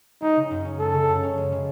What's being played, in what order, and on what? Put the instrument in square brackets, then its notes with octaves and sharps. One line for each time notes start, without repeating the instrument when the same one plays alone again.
[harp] G#3 [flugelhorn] D#4
[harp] C#3
F#2
C#4
[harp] G#3 [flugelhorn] A4
[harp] C#3
F#2
C#4
G#3
C#3